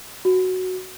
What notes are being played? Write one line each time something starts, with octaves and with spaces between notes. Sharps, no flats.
F#4